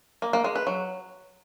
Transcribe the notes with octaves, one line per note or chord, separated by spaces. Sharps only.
A#3
A#3
G#3
B4
F#3